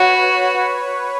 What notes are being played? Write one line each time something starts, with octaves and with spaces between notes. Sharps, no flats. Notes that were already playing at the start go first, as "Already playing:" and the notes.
Already playing: F#4 B4 C#5